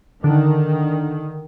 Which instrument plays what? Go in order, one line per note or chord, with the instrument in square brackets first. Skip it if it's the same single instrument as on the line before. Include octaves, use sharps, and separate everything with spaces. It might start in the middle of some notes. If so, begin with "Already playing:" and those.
[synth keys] D3 [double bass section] D#3